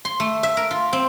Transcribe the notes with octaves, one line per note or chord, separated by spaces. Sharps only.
C6
A3
E5
A#4
F4
C4